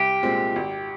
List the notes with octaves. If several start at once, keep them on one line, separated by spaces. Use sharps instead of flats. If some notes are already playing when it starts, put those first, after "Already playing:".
Already playing: C2 G4
A#2 G#3 C4
G#1